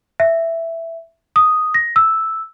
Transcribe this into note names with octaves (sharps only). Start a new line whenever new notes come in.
E5
D#6
A#6
E6